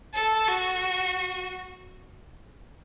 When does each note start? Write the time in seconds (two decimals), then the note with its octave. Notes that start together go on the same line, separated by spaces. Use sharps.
0.14 A4
0.48 F#4